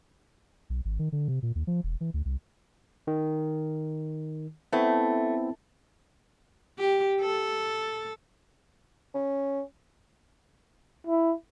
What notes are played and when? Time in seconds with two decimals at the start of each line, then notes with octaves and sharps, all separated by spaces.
0.70 B1
0.85 G#1
0.99 D#3
1.12 D3
1.28 C3
1.43 A#2
1.55 D#2
1.67 F3
1.84 E1
2.01 E3
2.14 D2
2.25 C2
3.07 D#3
4.73 A3 B3 C4 E4
6.78 G4
7.21 A4
9.14 C#4
11.07 E4